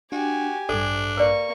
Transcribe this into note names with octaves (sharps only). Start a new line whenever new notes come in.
D4 F#4 G4 G#5
A1 G2 D4 A4
A#3 B4 D5 C#6